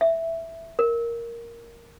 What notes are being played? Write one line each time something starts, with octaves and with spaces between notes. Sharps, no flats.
E5
A#4